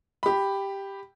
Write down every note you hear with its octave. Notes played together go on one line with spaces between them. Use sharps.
G4 B5